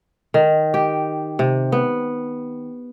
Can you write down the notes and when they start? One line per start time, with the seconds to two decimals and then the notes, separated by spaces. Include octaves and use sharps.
0.34 D#3
0.74 G4
1.39 C3
1.72 B3